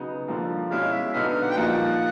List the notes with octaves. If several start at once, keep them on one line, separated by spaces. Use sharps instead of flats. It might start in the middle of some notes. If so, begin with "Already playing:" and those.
Already playing: C#3 F#3 B3 D#4
D3 F3 A#3
B2 G#3 C#4 E4 F5
E5
D3 F#3 B3 D#4 F5
F5
F#5
G5
A#2 F3 A#3 D#4 F#4 F#5